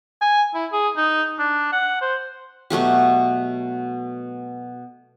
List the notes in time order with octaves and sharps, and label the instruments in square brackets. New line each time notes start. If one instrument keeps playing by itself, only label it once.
[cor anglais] G#5
E4
G#4
D#4
D4
F#5
C5
[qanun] B2 F#3 A3 G4